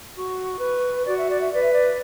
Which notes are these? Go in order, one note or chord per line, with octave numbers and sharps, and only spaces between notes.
F#4 C#6
B4
F#4 D5
E5
D5
E5
B4 D5
E5
D5